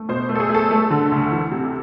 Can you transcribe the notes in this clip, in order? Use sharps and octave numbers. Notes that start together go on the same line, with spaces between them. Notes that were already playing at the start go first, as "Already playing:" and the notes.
Already playing: A3
B2 C5
A3
A4
G#4
A3
A4
A3
D3
D2
E3
C3